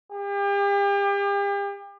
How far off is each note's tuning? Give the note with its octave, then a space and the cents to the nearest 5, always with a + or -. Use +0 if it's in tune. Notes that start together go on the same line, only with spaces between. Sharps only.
G4 +40